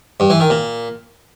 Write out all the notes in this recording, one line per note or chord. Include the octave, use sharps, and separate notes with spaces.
G2
E3
D#3
A#2